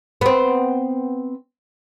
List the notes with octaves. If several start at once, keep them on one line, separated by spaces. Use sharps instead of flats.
B3 C4